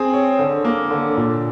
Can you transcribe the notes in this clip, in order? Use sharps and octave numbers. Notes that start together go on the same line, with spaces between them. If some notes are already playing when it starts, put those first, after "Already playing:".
Already playing: C4 G#4
C#5
D3
A#3
D3
A#2